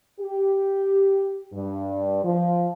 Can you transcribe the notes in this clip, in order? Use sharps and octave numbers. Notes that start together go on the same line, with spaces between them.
G4
G2
F3